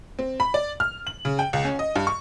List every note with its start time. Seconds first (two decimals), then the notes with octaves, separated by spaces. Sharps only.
0.19 C4
0.40 B5
0.54 D5
0.80 F6
1.07 F#7
1.25 C#3
1.39 G5
1.53 C#2
1.65 C#4
1.79 D#5
1.96 G2
2.07 C#6